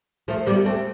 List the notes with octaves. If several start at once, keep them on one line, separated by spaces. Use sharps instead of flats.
F3 A3
G3 B3
A3 C4